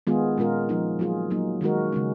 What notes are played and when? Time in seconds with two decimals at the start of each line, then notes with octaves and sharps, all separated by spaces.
0.07 D#3 G#3 B3 F4 G#4
0.37 A#2 G#3 C#4 F4 A#4
0.69 F3 G#3 D#4
0.99 F#3 A#3 F4 G#4
1.30 F#3 A#3 D#4
1.61 D#3 G#3 D#4 F#4 A#4
1.92 C#3 G#3 C#4